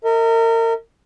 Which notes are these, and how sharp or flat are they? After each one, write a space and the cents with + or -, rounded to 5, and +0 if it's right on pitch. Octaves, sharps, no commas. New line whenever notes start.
A#4 -30 D#5 +45